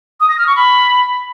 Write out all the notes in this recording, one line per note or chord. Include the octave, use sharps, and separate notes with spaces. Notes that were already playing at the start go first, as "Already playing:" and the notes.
D#6
A#6
F6
C#6
B5